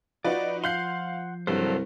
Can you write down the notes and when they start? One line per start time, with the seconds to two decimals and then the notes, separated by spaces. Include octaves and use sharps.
0.25 F3 D#4 F#4 B4 D5
0.64 F5 F#5 C6 G6 C7
1.47 C2 G2 F#3 A4 C5